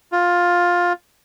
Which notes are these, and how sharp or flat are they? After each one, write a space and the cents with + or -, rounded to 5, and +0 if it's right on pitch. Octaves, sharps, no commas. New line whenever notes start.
F4 +10